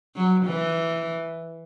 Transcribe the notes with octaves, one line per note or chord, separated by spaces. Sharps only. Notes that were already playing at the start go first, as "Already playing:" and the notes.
F#3
E3